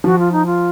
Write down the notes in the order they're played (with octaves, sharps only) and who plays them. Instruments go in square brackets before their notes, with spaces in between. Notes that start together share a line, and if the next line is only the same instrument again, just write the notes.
[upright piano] F3 [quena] F#4
[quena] F4
D#4
F4